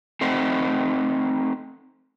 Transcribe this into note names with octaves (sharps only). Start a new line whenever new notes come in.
A3 C4 D#4 C5 F#5